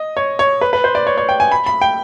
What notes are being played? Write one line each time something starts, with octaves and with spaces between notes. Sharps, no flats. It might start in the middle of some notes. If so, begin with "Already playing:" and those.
Already playing: D#5
C#5
C#5
B4
B4
C5
D5
C#5
C#5
G5
G#5
B5
B5
G5